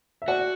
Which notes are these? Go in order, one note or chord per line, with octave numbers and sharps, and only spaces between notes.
E5
F#4 D5 F#5